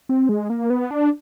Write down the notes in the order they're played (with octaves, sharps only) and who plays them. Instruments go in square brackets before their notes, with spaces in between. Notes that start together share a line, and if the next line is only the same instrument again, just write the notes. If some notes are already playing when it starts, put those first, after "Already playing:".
[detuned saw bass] C4
G#3
A#3
B3
D4